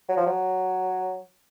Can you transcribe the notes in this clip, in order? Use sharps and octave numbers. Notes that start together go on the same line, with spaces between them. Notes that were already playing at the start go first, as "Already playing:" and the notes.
F#3
F3
F#3